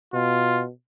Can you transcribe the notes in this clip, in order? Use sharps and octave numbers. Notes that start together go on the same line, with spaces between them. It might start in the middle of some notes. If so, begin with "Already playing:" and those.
B2 F4